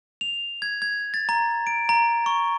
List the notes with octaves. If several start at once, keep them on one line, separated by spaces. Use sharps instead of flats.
F7
G#6
G#6
A6
A#5
D7
A#5
C#6